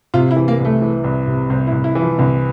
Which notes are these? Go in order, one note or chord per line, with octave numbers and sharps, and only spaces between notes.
C3 F4
E4
E3
A#3
C2 A3
E3
C2
C3
C2 C4
E4
C2
E4
E3
F3
C2 D3